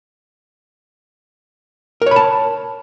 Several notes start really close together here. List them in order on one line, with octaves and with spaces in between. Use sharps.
A#4 C#5 B5 A5